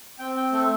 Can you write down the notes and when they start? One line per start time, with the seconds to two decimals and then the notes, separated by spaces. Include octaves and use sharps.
0.19 C4 G5
0.37 G5
0.52 A3 A4